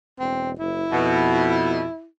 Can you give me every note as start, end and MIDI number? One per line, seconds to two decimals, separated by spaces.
0.19 0.57 28
0.19 0.51 60
0.59 0.84 30
0.59 2.06 64
0.92 1.87 41
0.92 1.82 47